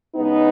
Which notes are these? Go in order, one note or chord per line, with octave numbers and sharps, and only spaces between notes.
C#3 G#3 B3 D#4